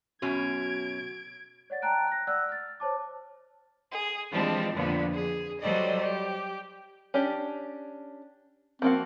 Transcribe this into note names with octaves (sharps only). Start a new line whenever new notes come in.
F#2 B2 C#4 F#4 G#6 D7
C#5 D5 F#5 A6
G5 A5 A#5 F#6 D7
F#6 A#6
D5 F#5 E6 F#6
F6 A6
C5 C#5 A5 D6
G#4
E3 F3 G3 G#3 C4 D4
F2 A#2 D3 F3 B3
G#4
F#3 G3 A4 C5 D5 D#5
G4
C#4 D4 G4
F3 A#3 C4 F#4